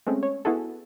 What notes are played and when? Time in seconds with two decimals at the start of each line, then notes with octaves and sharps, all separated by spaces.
0.07 G#3 A3 C4 C#4
0.23 C#5
0.45 B3 E4 F#4 G#4 A4